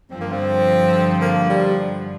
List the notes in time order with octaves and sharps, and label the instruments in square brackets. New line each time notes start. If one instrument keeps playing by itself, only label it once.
[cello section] G2 D3 F3 [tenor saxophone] C4
[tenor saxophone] A#3
C4
A#3
G3